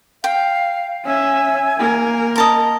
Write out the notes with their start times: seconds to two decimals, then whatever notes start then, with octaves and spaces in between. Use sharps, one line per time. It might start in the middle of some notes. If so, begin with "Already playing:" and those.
0.24 F5 G5
1.06 C#4 E5 G#5
1.78 A#3 A#4
2.36 D#5 A5 A#5